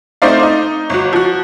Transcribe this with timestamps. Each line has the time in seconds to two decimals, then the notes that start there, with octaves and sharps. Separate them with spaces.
0.22 A3 C4 D#4 C5 D5 F5
0.43 D#4
0.90 G1 F#4
1.13 F3 F#4